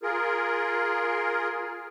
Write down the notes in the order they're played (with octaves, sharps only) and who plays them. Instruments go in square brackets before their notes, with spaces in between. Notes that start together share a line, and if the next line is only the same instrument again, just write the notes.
[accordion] F4 G#4 A#4